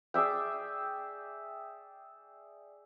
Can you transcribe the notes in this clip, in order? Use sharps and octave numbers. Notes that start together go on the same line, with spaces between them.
G#4 D5 E5 G5